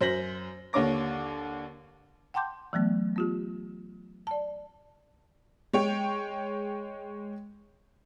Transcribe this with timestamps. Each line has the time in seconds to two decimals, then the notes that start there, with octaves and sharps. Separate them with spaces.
0.01 F#2 C5 A#6 B6 F#7
0.73 D#2 D3 C#5 D6 A#6
2.34 F#5 G5 A5 C6 D6 G6
2.73 E3 F#3 A3 B3
3.16 B3 F4 G4
4.27 D5 A5
5.73 G#3 C#5 G5